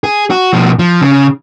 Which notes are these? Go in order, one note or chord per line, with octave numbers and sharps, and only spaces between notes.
G#4
F#4
B2 F3
F3
C#3